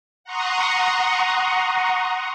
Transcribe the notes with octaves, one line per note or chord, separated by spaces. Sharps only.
F#5 A#5 C6 C#6 D#6